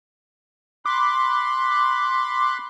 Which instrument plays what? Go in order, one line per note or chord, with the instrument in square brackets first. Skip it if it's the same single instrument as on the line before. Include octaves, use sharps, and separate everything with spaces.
[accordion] B5 C6 F#6 [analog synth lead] D6